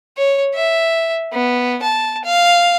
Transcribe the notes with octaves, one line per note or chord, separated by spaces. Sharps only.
C#5
E5
B3
A5
F5